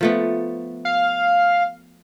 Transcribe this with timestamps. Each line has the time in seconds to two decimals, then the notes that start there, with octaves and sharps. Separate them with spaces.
0.01 F3 A3 B3
0.85 F5